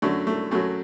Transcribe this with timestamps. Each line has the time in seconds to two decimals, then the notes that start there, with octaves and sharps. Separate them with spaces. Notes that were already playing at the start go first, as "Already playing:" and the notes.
0.02 F#2 D3 F#3 A3
0.27 A3
0.51 F#2 F#3 A3